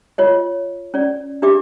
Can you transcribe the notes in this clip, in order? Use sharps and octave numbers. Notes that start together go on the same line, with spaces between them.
F4 C#5 D#5
C#4 D5
D4 G4 E5 D6